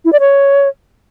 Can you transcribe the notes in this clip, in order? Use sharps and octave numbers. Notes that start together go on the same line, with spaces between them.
E4
D5
C#5